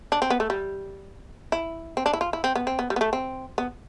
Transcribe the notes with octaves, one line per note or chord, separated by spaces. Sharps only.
D4
C4
B3
A3
G3
E4
C4
D4
E4
F4
E4
C4
B3
C4
B3
G3
B3
A3
C4
B3